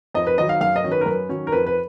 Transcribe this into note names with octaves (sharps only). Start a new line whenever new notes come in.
F2 D#5
B4
D#3 F#3 D#5
F5
F#2 F5
D#5
D#3 F#3 C#4
B4
A#4
F#2 B4
D#3 F#3 C#4
A#4
F2 B4
B4